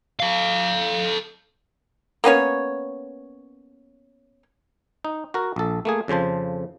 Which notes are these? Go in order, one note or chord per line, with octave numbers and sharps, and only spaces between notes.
A4 F5
A#3 B3 C#4 C#5
D#4
F#4 A#4
A#1 A4
A3 A#3 G#4
F2 C#3 F3 C5 A5